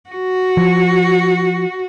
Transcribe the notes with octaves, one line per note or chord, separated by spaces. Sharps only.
F#4
F3